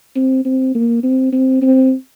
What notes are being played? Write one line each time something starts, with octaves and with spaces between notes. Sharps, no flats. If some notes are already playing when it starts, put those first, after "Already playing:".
C4
C4
A#3
C4
C4
C4